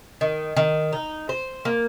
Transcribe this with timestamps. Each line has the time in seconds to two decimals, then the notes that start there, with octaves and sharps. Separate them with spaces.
0.21 D#3
0.57 D#3
0.93 D#4
1.29 C5
1.65 A#3